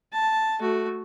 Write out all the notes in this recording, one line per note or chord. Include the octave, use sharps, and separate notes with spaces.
A5
A3 F#4